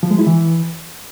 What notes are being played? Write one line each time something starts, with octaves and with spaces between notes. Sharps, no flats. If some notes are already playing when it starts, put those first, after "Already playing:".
F3
G#3
E4
E3